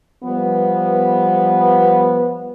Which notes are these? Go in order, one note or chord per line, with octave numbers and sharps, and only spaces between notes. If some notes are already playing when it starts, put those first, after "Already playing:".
F3 G3 B3